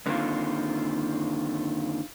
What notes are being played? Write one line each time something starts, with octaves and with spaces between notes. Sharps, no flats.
F#2 D3 D#3 A#3 C4 F4